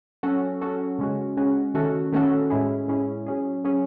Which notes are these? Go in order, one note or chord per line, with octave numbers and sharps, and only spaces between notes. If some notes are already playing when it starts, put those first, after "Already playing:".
F#3 C#4 F#4 A4
F#3 C#4 F#4 A4
C#3 G#3 C#4 F#4
C#3 G#3 C#4 F#4
D#3 A3 C#4 F#4 A4
D#3 A3 C#4 F#4 A4
A2 G#3 C#4 E4 G#4
A2 G#3 C#4 E4 G#4
F#3 C#4 G#4
F#3 C#4 G#4